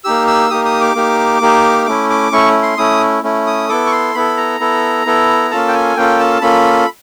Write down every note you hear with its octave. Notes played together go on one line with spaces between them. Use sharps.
A#3 D#4 G4 E6
E6
A#3 D#4 G4 D#6
D#6
D6
A#3 D#4 G4
A#3 D#4 G4
A3 C#4 E4 D6
D6
A3 C#4 E4 C#6
C6
A3 C#4 E4 D#6
A3 C#4 E4
D#6
B3 E4 A4 D6
C#6
C6
B3 E4 A4 B5
A#5
B3 E4 A4
B3 E4 A4
A#3 C#4 F4 A4 A5
G5
G#5
A#3 C#4 F4 A4 G5
A5
A#3 C#4 F4 A4 B5